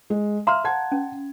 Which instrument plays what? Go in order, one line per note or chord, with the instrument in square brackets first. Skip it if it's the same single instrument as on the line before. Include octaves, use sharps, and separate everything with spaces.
[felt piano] G#3
[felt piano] E5 F6 [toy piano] F5 A#5 C6
[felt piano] F#5 A5 G#6
[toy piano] C#4